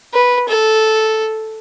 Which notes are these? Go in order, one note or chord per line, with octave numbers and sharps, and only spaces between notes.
B4
A4